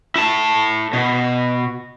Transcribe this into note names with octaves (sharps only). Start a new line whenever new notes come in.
E4 A5
B2